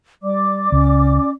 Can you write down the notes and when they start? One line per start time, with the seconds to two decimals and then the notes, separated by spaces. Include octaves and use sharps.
0.23 G3 D5 D6
0.72 C#2 C#4